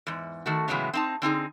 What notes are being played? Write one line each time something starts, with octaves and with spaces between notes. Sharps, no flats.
E2 G#2
D#3 A3 F#4
A2 C#3 E3 F#3 G#3 B3
C4 D#4 A5
D3 C4 D#4 G#4